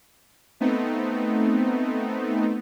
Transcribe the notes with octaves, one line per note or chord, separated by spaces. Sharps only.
A3 B3 C4 D#4